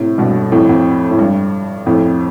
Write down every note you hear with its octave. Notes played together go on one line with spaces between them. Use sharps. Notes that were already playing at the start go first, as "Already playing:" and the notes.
Already playing: A2 C3
G2 B2
F2 A2
F2
A2
G2
F2 A2